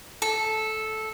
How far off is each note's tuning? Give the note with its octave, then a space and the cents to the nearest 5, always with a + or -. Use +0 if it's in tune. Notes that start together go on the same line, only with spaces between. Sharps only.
A4 -10